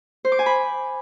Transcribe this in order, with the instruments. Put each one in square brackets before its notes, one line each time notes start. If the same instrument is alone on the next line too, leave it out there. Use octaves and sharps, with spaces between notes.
[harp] C5
D6
G#5
B5